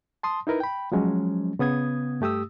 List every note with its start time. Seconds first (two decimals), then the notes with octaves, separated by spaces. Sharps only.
0.23 A5 C6 D#6
0.47 D#4 E4 A#4 B4
0.60 G5 B5
0.92 F3 F#3 G#3 C#4
1.59 C#3 B3 D#6 G#6
2.21 G2 A3 G4 D#6 E6